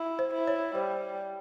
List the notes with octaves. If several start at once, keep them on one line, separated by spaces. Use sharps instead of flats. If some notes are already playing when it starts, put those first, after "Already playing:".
Already playing: E4
C5
E4
C#5
G3 C5